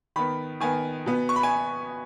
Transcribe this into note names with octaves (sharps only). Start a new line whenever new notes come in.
D#3 B3 B5
D#3 B3 G#5
B2 B3
C#6
B5
G#5